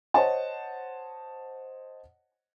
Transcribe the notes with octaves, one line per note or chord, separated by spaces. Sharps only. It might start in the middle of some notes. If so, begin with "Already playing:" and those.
C5 C#5 D#5 F#5 A5